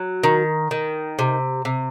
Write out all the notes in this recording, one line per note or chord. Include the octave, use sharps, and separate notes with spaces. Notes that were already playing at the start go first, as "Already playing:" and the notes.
Already playing: F#3
D#3
D#3
C3
C3